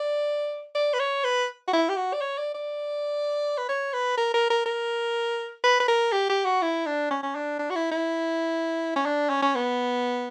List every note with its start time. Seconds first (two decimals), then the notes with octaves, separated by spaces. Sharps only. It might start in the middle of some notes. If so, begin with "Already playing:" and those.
Already playing: D5
0.75 D5
0.94 B4
0.99 C#5
1.24 B4
1.68 F#4
1.73 E4
1.89 G4
1.96 F#4
2.13 D5
2.21 C#5
2.38 D5
2.55 D5
3.58 B4
3.69 C#5
3.93 B4
4.17 A#4
4.34 A#4
4.50 A#4
4.66 A#4
5.64 B4
5.80 B4
5.88 A#4
6.12 G4
6.29 G4
6.45 F#4
6.62 E4
6.86 D4
7.11 C#4
7.23 C#4
7.35 D4
7.59 D4
7.70 F#4
7.76 E4
7.91 E4
8.96 C#4
9.05 D4
9.30 C#4
9.43 C#4
9.55 B3